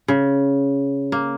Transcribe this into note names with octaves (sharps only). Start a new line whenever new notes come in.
C#3
A#3